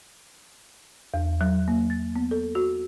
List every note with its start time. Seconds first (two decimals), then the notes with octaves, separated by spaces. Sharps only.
1.14 E2
1.41 F#3
1.68 A#3
1.90 A6
2.16 B3
2.31 A4
2.55 F#4